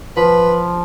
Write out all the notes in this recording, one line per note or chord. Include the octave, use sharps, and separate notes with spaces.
F3 B4